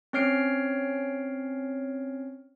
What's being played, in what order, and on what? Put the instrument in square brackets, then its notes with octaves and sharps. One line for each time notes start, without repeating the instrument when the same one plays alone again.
[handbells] C4 C#4 C#5 F6 C7 D7